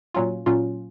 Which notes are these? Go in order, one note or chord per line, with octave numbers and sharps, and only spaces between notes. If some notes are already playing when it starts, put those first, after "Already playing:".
A#2 F#3 C#4 F4
A#2 F#3 C#4 F4